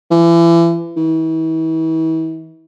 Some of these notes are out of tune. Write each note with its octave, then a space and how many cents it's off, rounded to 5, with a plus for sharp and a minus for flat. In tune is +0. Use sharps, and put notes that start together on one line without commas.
E3 +35
E3 -40